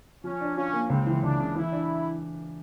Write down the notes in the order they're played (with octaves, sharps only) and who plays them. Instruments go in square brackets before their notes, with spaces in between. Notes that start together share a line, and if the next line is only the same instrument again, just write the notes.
[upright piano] F3 [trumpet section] C#4
[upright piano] D4
[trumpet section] C#4 [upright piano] F4
[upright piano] A#3
[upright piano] C#2 [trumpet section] C4
[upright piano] E3
[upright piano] C#2 [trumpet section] D4
[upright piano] C#3
[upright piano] E3 [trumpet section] E4
[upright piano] D4